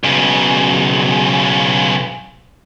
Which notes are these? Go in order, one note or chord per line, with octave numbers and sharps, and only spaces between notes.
B1 C#3